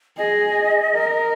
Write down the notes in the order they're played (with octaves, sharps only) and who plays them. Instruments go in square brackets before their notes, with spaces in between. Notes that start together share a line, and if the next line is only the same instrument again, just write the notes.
[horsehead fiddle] G#4 [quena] D#5
[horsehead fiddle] A#4